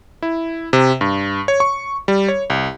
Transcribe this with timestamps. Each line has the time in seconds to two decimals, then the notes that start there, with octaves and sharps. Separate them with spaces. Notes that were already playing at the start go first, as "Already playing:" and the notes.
0.22 E4
0.73 C3
1.01 G2
1.48 C#5
1.60 C#6
2.08 G3
2.28 C#5
2.50 C2